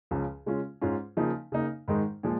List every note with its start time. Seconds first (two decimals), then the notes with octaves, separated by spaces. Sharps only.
0.11 C#2 C#3 F3 C#4
0.46 C#3 G#3 C#4 F4
0.81 G#2 G#3 C#4 F4
1.17 C#3 F3 A#3 D#4
1.52 C#3 A#3 D#4
1.88 G#2 D#3 G#3 D#4
2.23 A#2 F3 G#3